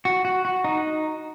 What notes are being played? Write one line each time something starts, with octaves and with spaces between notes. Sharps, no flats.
F#4
F#4
F#4
D#4